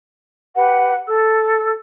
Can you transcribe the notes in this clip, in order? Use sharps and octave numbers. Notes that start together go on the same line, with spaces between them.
G4 B4 F#5
A4 E6